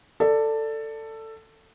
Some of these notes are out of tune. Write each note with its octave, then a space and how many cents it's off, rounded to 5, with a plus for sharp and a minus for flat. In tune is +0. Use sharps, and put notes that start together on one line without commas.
A4 +15 D5 +0